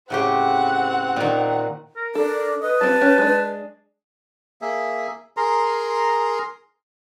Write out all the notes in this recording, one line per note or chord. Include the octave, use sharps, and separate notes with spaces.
A2 C#3 C4 G4 F#5
A#2 D#3
A#4
D4 A4
B4 D#5
G3 C4 F4 A5
C#4 G4
G#3 D4
A#3 G#4 E5
G#4 A#4 A#5 C6